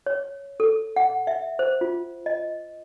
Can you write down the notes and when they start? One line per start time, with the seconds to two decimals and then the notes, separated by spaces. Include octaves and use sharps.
0.06 C#5
0.60 A4
0.96 F#5
1.27 E5
1.59 C5
1.81 F4
2.26 D#5